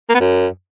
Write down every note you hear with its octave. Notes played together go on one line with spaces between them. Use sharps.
A#3
B3
F#2